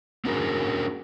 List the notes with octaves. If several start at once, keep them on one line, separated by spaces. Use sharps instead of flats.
A#3 C#4 D4 F#4 G#4 A#4